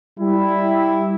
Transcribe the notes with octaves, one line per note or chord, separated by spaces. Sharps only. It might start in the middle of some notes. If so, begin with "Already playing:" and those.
G3 E4